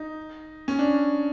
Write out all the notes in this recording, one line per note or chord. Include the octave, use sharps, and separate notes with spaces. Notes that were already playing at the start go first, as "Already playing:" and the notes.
Already playing: D#4
C#4
D4